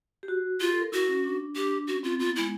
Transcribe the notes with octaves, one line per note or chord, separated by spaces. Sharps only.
G4
F#4
F4 G4
A4
A#4
E4 F#4
C#4
D4
D4 G4
C#4 F#4
C4 F4
B3 F4
G#3 E4